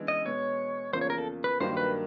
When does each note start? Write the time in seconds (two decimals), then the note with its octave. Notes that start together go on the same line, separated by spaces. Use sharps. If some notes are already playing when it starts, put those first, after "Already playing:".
Already playing: C#3 E3 G#3 B3 D4
0.08 D#5
0.25 B2 G#3 B3 C#5
0.93 E2 C#3 F3 A#3 C5
1.01 C#5
1.10 A#4
1.18 A4
1.44 B4
1.60 G2 D#3 F#3 A#3 D4 C5
1.77 B4